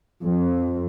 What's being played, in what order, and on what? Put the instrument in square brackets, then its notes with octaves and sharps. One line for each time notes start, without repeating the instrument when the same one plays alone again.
[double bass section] F2